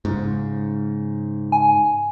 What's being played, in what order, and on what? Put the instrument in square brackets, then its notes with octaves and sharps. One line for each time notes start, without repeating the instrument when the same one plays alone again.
[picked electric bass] G#2 C#3
[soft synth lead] G#5